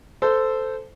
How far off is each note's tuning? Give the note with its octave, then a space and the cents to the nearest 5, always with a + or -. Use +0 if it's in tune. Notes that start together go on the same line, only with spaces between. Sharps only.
A4 +0 C5 -15